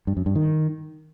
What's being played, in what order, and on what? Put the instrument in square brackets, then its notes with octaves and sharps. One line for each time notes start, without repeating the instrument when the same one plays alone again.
[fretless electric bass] G2
F#2
G2
D#3